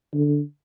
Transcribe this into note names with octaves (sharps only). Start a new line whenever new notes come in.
D3